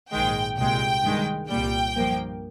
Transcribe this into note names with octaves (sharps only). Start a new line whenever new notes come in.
A#1 G#2 D#3 G#3 G5
C2 A#2 G#3 G5
G2 D#3 G#3
C2 A#2 G3 G5
G2 F3 A#3